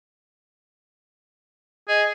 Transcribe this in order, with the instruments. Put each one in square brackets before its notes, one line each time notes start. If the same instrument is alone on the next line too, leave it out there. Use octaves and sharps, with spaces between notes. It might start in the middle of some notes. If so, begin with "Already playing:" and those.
[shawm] G#4 [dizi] D#5